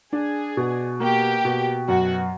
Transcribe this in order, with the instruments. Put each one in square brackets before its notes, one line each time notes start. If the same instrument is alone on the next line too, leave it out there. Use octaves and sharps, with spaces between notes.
[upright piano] D4 [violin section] G#4
[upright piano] B2
[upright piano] A#3 [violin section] G4
[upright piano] B2
[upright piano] F#2 [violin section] F#4